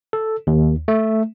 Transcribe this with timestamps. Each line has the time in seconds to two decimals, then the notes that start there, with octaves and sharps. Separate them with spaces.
0.13 A4
0.47 D#2
0.88 A3